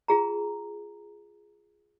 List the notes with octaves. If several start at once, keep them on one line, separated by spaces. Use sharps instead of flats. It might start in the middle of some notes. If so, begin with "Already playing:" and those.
F4 G#4 A#5